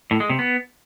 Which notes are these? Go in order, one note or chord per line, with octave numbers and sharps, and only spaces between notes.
A2
G#3
C3
B3